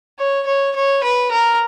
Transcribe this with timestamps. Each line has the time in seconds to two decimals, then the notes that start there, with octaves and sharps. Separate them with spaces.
0.19 C#5
0.47 C#5
0.75 C#5
1.03 B4
1.32 A#4